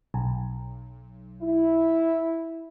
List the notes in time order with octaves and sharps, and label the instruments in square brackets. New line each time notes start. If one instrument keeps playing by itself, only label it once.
[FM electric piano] B1
[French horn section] E4